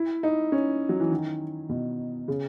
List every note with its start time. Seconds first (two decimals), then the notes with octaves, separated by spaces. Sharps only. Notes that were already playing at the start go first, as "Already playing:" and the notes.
Already playing: E4
0.23 D#4
0.52 C#4
0.89 F#3
1.00 E3
1.11 D#3
1.69 B2
2.28 C#3